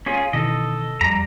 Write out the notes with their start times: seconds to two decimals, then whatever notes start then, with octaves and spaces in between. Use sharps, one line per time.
0.06 C#4 F4 G#4
0.33 B2 D#3 E3 A4 D#5
1.01 F2 G3 A#5